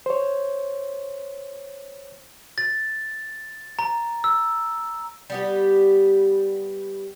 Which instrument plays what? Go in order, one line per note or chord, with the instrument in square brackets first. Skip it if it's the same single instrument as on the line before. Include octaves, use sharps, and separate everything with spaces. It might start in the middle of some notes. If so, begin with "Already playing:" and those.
[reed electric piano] C5 C#5
[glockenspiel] A6
A#5
E6
[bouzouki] G3 B3 G4